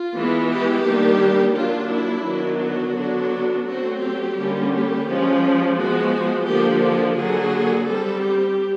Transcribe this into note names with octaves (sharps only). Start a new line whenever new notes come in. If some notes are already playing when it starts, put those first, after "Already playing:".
Already playing: F4
E3 G#3 B3
G4
D#3 G3 A#3 D4
F#3 A#3 D4 F4
E4
D#3 F#3 B3 D4
F#4
D3 F#3 B3 D4
F#3 A3 C4 F#4
G4
D3 G3 A#3 C#4
G4
F3 G#3 C#4
F3 G#3 B3 F#4
D3 F3 A#3 G4
G4
D3 F#3 A#3 G#4
G3 C4 A4
G4